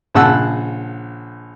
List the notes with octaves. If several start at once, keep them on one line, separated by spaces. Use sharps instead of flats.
A#1 C#3 F#5 A5 E6 F#6